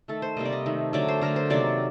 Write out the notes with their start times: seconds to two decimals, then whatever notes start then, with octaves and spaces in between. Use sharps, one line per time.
0.08 D#3 A3 A4
0.22 C5
0.37 C3 G3 A#3 D#5
0.45 D5
0.52 D#5
0.66 D#3 A3
0.93 D3 F#3 A3 D5
1.08 C5
1.21 D3 A3 A#4
1.36 C5
1.50 C3 D#3 F#3 A#3 D5